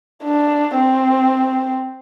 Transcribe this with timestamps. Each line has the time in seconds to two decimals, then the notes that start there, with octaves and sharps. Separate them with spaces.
0.23 D4
0.76 C4